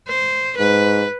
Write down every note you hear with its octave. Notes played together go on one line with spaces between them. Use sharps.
C5
G#2 B4